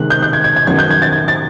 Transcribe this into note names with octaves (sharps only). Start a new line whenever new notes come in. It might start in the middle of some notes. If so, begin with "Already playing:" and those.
Already playing: C3 D#3 G#3 F#6
G6
G6
G#6
G#6
G#6
F#2 D#3 F#3 B3 G#6
G6
G#6
A6
G#6
A6